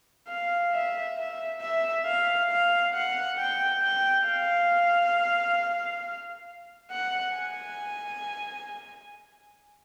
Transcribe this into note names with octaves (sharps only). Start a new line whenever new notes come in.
F5
E5
E5
E5
F5
F5
F#5
G5
G5
F5
F#5
G#5